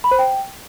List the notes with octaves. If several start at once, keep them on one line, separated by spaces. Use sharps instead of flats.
B5
C5
G5